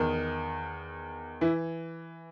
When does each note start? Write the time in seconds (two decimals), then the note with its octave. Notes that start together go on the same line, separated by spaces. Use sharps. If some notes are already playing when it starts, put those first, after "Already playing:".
Already playing: E2 D#3
1.41 E3 E4